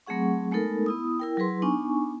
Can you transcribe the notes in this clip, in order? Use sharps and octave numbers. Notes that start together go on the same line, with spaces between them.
F#3 A3 C4 G#4 F#5 C#6
G#3 A3 B3 D#4 A4 A#4
B3 E4 D#6
E4 A#4 G5
F#3 E4 G#4 B4 C6
B3 D4 D#4 G#5 C#6